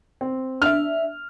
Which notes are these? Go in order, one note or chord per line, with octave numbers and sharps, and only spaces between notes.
C4
D4 E5 F6